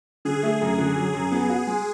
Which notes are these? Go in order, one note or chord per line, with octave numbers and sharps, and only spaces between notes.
D3 G#4
A3
F#2
D3
F#3
F#2
B3
F#4
G#3